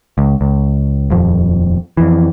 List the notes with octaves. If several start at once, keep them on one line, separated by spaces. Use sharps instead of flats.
C#2
C#2
D#1 F2
F2 E3